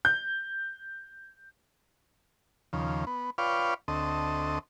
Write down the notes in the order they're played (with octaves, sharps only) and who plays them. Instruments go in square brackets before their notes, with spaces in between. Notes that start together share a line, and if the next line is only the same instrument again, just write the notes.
[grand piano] G6
[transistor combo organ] D#2 C#3 F3
B3
F4 B4 C#5 D5 F5 G5
D2 C4 A4 D#5